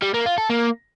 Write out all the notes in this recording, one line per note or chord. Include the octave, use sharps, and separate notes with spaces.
G3
A#3
F4
A4
A#3